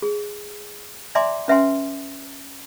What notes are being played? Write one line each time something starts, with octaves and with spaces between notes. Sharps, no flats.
G#4
D5 E5 G#5 A#5 C6 D6
C#4 B4 E5 F#5 G#5 C6